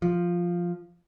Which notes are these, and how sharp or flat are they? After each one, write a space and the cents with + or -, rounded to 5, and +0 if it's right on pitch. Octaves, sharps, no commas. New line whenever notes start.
F3 +0